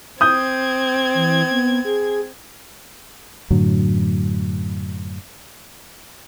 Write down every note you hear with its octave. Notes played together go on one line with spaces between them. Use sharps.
C4 D#6 G6 G#6
E3
B3
G#4
F#2 A2 D3 F#3